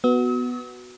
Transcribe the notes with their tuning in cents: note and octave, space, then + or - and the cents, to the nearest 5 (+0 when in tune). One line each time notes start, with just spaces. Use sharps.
B3 +0 F#4 +0 E6 -45